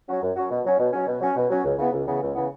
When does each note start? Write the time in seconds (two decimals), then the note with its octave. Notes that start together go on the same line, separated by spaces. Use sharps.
0.08 F#3 C#4 F#4
0.22 F#2
0.36 F#3 C#4 F#4
0.50 B2
0.65 F#3 C#4
0.79 B2
0.93 F#3 C#4
1.07 B2
1.21 F#3 C#4
1.36 B2
1.50 F#3 C#4
1.64 C#2
1.78 C#3 E3 B3
1.93 C#2
2.07 C#3 E3 B3
2.22 C#2
2.35 C#3 E3 B3